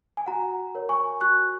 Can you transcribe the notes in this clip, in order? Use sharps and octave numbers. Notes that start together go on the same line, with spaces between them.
G#5
F#4 F#5 A#5
A#4 C#5
G#5 C#6
F#4 C#6 F#6